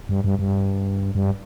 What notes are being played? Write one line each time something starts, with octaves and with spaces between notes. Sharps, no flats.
G2
G2
G2
G2